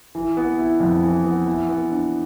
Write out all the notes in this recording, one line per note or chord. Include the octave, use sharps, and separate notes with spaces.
E3
B3
E4
F2
E3
B3
E3
B3
D4